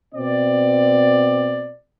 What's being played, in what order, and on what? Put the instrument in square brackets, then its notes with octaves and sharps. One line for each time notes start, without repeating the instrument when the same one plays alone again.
[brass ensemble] B2 C4 D5